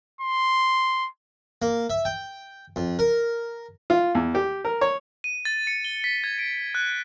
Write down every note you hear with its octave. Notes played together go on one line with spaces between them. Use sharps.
C6
A#3
E5
G5
F2
A#4
F4
E2
G4
A#4
C#5
D#7
A6
C#7
G7
B6
G#6
D7
F#6